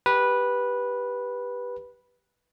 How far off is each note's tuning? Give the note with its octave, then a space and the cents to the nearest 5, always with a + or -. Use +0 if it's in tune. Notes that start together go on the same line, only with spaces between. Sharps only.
G4 +0 B4 -10